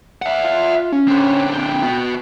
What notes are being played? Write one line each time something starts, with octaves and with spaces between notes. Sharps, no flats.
E5 F#5
F4
C#4
D3 C4
G5
B3 F#4